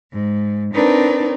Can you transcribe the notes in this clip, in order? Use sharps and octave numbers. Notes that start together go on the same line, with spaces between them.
G#2
C4 D4 D#4 A#4 B4